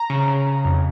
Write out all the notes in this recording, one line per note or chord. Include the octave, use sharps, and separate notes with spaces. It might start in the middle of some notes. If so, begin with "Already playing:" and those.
Already playing: A#5
C#3
C#3
C#3
F2